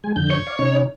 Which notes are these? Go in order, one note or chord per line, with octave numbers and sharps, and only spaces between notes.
G#3 G#5
F2 D3 G6
C#5
D5 F5
C3 C#4 D#4